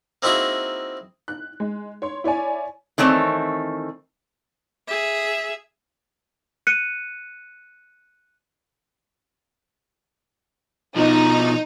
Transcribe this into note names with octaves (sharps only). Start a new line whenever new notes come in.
A#3 C4 D#4 E4 F#4 G#4
F#6
G#3
C#5 C6
E4 C#5 D5 G#5
D#3 E3 A3 C4 C#5
G#4 E5
F#6 C#7 D#7
B2 F3 D#4